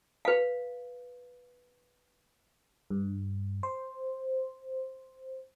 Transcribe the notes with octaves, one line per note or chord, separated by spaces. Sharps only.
B4 F5
G2
C5